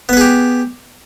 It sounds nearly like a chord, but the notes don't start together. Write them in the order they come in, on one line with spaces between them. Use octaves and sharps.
B3 B4 G#4 G4